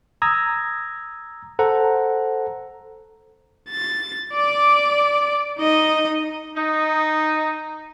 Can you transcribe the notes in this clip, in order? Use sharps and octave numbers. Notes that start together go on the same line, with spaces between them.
A#5 D#6 E6 G#6 A#6
A4 C5 F#5 A#5
A6
D5 D6
D#4 D#5
D#4